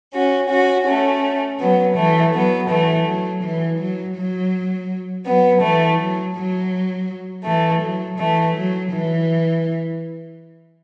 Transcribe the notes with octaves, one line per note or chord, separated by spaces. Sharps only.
C#4 F#4
C#4 F#4
A3 C#4
F#3 B3
E3 A3
F#3 B3
E3 A3
F#3
E3
F#3
F#3
F#3 B3
E3 A3
F#3
F#3
E3 A3
F#3
E3 A3
F#3
E3